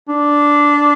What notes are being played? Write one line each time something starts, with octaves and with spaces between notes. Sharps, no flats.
D4